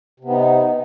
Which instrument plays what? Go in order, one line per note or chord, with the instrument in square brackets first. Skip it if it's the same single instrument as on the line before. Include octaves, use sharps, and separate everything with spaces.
[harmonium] C3
B3
D#4